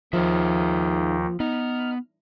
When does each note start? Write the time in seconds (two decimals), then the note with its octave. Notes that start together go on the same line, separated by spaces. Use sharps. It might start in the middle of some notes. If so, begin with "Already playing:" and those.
0.13 D#2 D#3 F3 D#4 G#4 E5
1.40 B3 D#4 F6